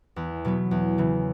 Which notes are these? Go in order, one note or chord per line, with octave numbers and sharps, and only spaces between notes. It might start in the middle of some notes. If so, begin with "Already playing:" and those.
E2 E4
B2 F#3 B3
E2
C#3 E3